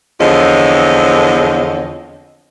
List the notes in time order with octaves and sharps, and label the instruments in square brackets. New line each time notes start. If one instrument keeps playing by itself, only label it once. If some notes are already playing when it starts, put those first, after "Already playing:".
[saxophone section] E2 D3 F3 C4 C#5 D#5